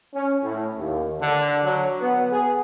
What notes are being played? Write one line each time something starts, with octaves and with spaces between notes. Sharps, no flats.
C#4
A2
D#2
D3
F#3
B3
G#4